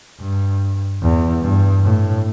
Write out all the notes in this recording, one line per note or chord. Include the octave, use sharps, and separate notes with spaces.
G2
E2
G2
A2